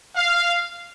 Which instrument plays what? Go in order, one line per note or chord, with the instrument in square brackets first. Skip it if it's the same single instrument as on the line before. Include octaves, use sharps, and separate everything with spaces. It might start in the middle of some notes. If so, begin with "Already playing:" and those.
[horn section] F5